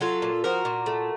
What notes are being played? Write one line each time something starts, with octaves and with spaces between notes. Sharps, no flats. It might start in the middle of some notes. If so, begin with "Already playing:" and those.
F#3 F4 A4
A#2
F3 F#4 A#4
A#2
A3